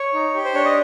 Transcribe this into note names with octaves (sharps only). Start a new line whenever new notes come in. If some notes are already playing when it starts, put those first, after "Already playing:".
Already playing: C#5
D#4
G4
C5
D4 C#5
D#5